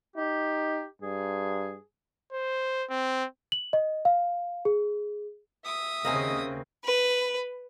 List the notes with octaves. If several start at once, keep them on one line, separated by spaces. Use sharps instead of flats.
D#4 G4
G2 G#4
C5
C4
F#7
D#5
F5
G#4
E5 D#6
D#2 C#3 A#3 C4 D#5 G#5
B4